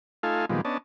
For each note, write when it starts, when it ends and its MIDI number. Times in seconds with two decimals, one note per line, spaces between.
0.23 0.45 57
0.23 0.45 63
0.23 0.45 65
0.23 0.45 69
0.23 0.45 77
0.23 0.45 80
0.50 0.61 46
0.50 0.61 51
0.50 0.61 53
0.50 0.61 55
0.50 0.61 56
0.50 0.61 59
0.65 0.78 59
0.65 0.78 61
0.65 0.78 62
0.65 0.78 75
0.65 0.78 81